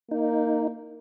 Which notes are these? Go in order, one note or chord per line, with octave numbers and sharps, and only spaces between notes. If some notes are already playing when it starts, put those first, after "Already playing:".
A#3 D#4